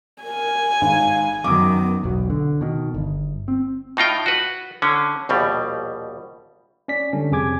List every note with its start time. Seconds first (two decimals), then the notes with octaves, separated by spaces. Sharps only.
0.23 A#4 G#5
0.81 G#1 F5
1.44 F#2 D#3 B3 D6 D#6
2.03 E1 B1 B2
2.30 D3
2.61 B2 D#3
2.94 G1
3.48 C4
3.97 A2 D#4 F4 G5
4.26 F#4 B4
4.82 D3 C#4
5.29 A#1 D#2 B2 G3
6.88 C#4 D5 B6
7.13 D3 G3 C#4 D4
7.31 F2 C3 G#4 G#5 D6 G#6